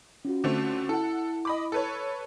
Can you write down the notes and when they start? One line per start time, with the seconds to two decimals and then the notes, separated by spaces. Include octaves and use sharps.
0.25 C#4 F4 F#4
0.44 D3 A3 C4
0.89 E4 A4 F#5
1.45 D#5 B5 D6
1.72 A4 B4 C#5